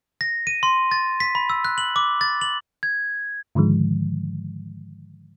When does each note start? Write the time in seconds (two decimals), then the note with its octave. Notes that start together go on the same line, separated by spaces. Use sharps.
0.21 A#6
0.47 D#7
0.63 C6
0.91 A6
1.20 B6
1.35 B5
1.50 E6
1.65 F#6
1.78 F#7
1.96 D6
2.21 A6
2.41 F#7
2.83 G#6
3.55 G#2 D3 D#3 F3 G#3